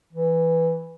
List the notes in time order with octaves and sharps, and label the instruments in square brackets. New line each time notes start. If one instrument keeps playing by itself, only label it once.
[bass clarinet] E3